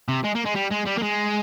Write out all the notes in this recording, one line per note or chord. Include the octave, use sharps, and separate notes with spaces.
C3
G#3
A#3
G#3
G3
G#3
G3
A#3
G#3